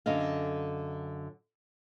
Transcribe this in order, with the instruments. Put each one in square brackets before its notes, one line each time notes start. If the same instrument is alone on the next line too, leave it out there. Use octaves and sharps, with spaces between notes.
[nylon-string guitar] F#2 D3 D#5 F5